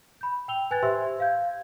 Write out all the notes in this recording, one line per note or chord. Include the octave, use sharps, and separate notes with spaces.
B5 G6
G5 E6 F7 G7
B4 G#5 F#6 G#6 A6
G4 C5 E5 C6 E6
F5 G6 G#6